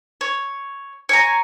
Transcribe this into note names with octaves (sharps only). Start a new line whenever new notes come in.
C#5
C#5 G#5 A#5